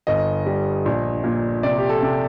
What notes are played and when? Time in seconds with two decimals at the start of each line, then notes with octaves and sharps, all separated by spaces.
0.07 G1 D#5
0.46 G3
0.85 A#1
1.24 A#2
1.63 C3 D5
1.78 G4
1.89 A4
2.02 C3